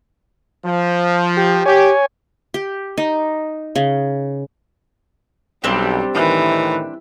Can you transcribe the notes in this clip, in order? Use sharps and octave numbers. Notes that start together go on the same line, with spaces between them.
F3
G4
G4 C#5 G#5
G4
D#4
C#3
B1 G3 C4 D4 G4
A2 D#3 E3